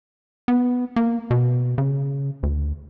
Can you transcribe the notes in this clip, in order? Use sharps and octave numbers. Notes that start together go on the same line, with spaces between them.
B3
A#3
B2
C#3
D2